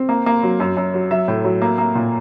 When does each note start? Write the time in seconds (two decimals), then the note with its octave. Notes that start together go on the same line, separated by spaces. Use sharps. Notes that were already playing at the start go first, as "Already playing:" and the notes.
Already playing: C4
0.09 A#3
0.26 A#3
0.43 F#3
0.60 F#2
0.77 F#2
0.94 F#3
1.11 F#3 E5
1.28 A2
1.44 F#3
1.62 A#3
1.78 A#3
1.95 A#2